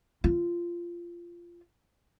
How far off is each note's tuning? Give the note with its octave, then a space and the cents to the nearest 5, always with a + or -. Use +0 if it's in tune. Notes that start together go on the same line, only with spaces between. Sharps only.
F4 -15